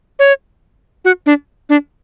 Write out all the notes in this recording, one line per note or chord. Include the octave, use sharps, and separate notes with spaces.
C#5
F#4
D4
D4